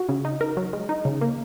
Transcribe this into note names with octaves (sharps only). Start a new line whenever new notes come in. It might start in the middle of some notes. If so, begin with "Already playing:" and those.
Already playing: F#4
C#3
D#4
A#4
F#3
G#3
D#4
C#3
A#3